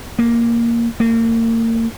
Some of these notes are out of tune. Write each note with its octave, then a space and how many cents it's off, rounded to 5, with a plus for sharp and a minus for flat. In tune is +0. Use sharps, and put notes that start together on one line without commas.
A#3 +0
A#3 -35